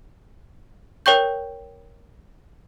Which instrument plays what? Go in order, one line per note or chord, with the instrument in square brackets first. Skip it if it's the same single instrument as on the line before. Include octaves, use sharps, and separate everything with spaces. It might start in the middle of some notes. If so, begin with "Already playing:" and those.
[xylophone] A#4 C#5 G5 C#6 G6